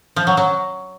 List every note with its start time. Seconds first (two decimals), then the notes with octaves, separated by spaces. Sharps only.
0.16 F3
0.27 F#3
0.37 F#3